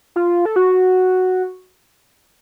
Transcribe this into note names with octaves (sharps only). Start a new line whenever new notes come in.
F4
A4
F#4